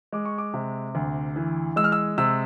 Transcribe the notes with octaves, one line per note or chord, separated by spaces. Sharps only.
G#3 D6
C#6
D6
C3
D2
E3
G#3 E6
F6
E6
C3 E6